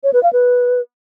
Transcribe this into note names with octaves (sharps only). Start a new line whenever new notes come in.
C#5
B4
F5
B4